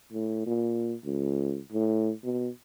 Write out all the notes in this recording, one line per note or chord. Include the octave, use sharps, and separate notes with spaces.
A2
A#2
C#2
A2
B2